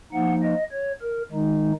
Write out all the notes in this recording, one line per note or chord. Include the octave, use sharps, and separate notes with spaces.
F3 A#3 D#4 F#5
D#5
C#5
A#4
D#3 G#3 D#4